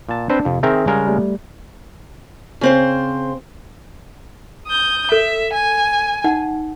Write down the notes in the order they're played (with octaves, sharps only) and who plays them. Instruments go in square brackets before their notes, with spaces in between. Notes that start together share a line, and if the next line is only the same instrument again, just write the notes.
[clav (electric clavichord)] A#2 A5
[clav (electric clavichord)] C4 B4 C5 [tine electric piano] D4
[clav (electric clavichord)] F2 [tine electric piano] C3
[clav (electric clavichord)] D#3 C4 A#4 [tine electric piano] G#4 E5
[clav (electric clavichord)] C#3 G#3 A#4 [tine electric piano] G3
[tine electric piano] G3 A3
[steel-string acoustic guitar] C#3 C4 C5
[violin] D#6 G6
[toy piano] A4 [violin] E5
[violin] G#5
[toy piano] D#4 F#5